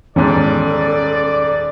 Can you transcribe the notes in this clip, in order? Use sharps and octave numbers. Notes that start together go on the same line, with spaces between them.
D#1 E2 G#2 C#4 A4 D5